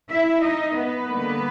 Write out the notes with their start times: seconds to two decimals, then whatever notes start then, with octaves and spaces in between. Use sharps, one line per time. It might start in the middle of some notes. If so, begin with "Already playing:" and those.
0.08 E4 E5
0.41 D#4 D#5
0.75 B3 B4
1.08 D3 G3 A#3